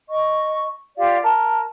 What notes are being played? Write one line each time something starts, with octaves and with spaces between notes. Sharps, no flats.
D#5 C#6
F4 G4 D5 F5
A#4 A5